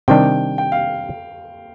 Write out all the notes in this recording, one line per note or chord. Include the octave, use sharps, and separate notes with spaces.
C3 D#3 G3 D4 G5
G5
F5